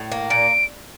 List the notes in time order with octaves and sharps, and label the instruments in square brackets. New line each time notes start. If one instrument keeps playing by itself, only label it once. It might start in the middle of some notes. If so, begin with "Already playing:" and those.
Already playing: [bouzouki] A2
A#3
[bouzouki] A#2 [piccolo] D7